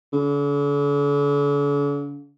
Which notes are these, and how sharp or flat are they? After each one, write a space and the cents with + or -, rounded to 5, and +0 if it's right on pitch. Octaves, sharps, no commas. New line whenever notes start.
D3 -45